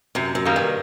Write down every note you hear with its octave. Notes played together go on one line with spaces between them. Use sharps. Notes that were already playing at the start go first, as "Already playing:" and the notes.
F#2 C3
F#2
D#3 G3 A#3
G2